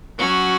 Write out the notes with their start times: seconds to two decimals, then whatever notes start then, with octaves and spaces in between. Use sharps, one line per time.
0.18 F#3 C#4 F#4